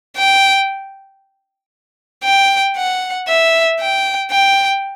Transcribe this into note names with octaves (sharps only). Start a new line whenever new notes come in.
G5
G5
F#5
E5
G5
G5